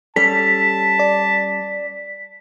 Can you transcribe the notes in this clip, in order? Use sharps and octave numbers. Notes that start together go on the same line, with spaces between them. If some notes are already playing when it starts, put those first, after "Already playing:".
G3 C#4 A4 A5 B6
D5